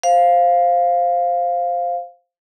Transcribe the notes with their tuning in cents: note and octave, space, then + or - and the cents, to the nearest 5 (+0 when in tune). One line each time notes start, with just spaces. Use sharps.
C5 +0 F5 +0